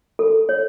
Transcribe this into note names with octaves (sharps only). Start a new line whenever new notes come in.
A4
C#5